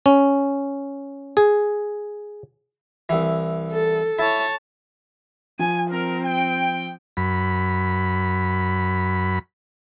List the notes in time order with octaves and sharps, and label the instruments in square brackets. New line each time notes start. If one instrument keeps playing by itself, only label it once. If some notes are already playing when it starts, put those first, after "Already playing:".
[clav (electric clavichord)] C#4
G#4
[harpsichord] C2 E3
[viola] A4
[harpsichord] E4 [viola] C#5 A5
[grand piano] F3 [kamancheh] G#5
[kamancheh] C4 [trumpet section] A#4
[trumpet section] G5
[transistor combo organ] F#2 B5